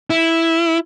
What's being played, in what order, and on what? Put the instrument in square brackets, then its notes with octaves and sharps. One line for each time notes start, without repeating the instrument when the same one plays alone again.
[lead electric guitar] E4